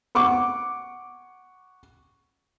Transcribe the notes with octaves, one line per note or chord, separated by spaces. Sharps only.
F#5 C#6 D6